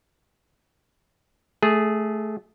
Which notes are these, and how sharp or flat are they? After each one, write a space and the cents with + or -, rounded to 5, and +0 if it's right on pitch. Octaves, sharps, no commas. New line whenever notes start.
A3 -15 G#4 +0